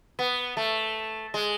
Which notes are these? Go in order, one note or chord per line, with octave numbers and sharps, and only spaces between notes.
B3
A3
G#3